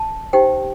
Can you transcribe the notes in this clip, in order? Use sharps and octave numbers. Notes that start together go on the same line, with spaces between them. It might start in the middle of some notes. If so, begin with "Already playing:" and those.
Already playing: A5
D#4 G4 C5 G5